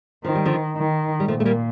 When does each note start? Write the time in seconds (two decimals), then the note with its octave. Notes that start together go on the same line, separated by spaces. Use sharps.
0.24 D#3 F3
0.35 G3
0.45 D3 F3
0.76 D#3
1.20 G3
1.28 A#2 F3 A3
1.40 A3
1.45 G3 A#3